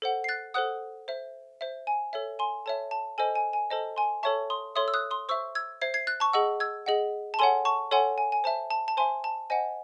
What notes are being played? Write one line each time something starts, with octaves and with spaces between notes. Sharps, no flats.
A4 C5 F#5
C7
F#6 A6
A4 C5 F#5 D#6 F#6
C5 E5
C5 E5
G#5
A4 C#5 E5
G#5 C6
A4 C#5 E5 A5
A5
A4 C5 D#5 G#5
G#5
G#5
A4 C5 D#5 A5
G#5 C6
A4 C#5 E5 A5 C#6
C6 D#6
A4 C#5 E5 C6 D#6
E6
D#6 F#6
C6 D#6
C5 E5 C#6 E6
E6 G#6
C5 E5 G#6 C7
G#6 C7
F#6 A6
A5 C#6
G#4 D#5 F#5 C#6 E6
E6 G#6
G#4 D#5 F#5
A5
A4 C#5 F#5 G#5 C6
A5 C#6
A4 C#5 F#5 G#5 C6
G#5
G#5
C5 E5 A5
A5
A5
C5 E5 G#5 C6
A5
C5 D#5 F#5 G#5